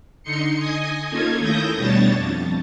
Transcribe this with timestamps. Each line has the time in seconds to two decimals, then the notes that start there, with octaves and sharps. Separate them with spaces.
0.23 D3 D#4 C6 C#7
0.59 D#5 G#5 D#6
1.10 A#3 C#4 D#4 F4 A4 G#6
1.39 D#2 A3 E4 D#6 G6 A#6
1.77 B2 G3 D4 C#5 A5 A6
2.13 F2